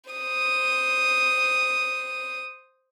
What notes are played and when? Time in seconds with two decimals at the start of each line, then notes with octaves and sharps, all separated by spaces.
0.10 C5 D#6